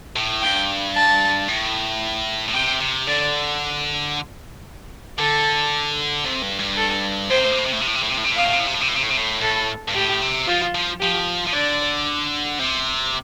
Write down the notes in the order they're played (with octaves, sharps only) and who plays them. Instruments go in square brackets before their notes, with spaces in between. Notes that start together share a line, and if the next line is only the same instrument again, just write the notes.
[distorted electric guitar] A2
[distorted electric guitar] G2 [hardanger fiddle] G5
[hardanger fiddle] A5
[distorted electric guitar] A2
A2
[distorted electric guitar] C3 [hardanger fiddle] G5
[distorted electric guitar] C3
[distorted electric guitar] D3 [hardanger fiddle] D5
[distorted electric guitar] D3 [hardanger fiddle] A4
[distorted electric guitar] C3
G2
G2
[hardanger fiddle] A4
[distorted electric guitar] A2 [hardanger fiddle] C5
[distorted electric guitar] C3
A2
C3
A2
C3
A2
C3
A2
C3
A2
C3
A2
C3
A2
[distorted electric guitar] C3 [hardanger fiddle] F5
[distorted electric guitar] A2
C3
A2
C3
A2
C3
A2
C3
A2
C3
A2
[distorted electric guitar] A2 [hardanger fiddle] A4
[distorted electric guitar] G2
[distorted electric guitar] A2 [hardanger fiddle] G4
[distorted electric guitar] C3
[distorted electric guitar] F3 [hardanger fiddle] F4
[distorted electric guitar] F3
[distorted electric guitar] F3 [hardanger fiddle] G4
[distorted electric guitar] F3
[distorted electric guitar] D3 [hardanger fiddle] D5
[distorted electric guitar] C3